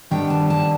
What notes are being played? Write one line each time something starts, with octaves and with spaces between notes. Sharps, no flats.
D#3 G3 B3 D4 G5
A5
A5